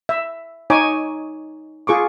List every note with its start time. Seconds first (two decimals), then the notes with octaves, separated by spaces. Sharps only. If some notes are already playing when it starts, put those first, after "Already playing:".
0.09 E5
0.70 D#4 C#5 G#5 D6
1.87 F4 G#4 C#6 D6